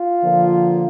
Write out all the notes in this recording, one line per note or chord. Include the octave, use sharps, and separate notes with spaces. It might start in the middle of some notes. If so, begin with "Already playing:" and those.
Already playing: F4
D3 F3 A#3